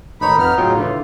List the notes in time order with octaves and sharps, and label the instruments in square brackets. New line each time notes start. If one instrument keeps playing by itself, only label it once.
[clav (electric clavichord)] A1 C#5 [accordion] D#3 [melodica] D#4 [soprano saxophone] B5
[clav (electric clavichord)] F2 [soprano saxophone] B3 [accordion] F6
[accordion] A2 C#3 [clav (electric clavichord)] F#3 C#5 G5 [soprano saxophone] F4
[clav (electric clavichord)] D3 E3